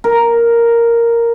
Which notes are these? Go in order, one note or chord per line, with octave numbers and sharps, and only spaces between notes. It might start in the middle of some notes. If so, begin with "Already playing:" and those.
A#4